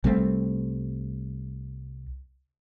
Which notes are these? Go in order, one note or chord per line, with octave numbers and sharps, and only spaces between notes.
C2 G3 A3 C4